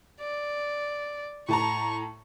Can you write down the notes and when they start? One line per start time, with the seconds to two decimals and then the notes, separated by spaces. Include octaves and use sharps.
0.20 D5
1.48 A2 A5 A#5 C#6